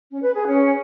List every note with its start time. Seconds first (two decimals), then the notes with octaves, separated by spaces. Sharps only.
0.11 C#4
0.23 B4
0.35 G#4
0.47 C#4